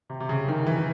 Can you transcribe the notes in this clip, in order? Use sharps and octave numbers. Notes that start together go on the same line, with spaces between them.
C3
C3
C#3
D#3
E3